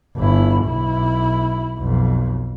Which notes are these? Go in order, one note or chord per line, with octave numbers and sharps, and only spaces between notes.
G1 E4
B1 E4
B1 F2